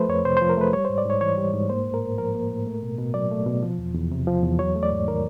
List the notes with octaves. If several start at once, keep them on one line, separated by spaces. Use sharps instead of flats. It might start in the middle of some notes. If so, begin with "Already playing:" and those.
Already playing: F3 A3 B4 C5
F2 C#5
C3 C5
F3 C5
A#4
A3 B4
G3 C#5
G#2 C5
D5
G#2 C#5
E3 C#5
G3
G#2
A#3 C5
A2
A#4
A2
F3 A#4
A#3
A2
A3
B2
B2
F#3 D5
A3
B2
F3
E2
E2
C3
F3
E2
F#3 C#5
A3
D5
G#2
D#3 A#4